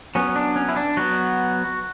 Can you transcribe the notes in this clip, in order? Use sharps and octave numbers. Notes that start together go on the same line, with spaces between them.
F#3 B3 C#4
D4
C#4
E4
D4
F#3 B3 F#4